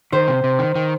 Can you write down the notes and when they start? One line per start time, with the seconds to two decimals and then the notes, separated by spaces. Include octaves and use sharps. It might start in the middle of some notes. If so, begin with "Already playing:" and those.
0.12 D#3 C5
0.28 C3
0.44 C3
0.59 D#3
0.75 D#3